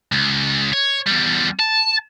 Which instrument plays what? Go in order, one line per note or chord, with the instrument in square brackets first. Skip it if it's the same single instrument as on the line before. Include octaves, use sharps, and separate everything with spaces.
[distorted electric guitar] C#2
C#5
E2 G3
A5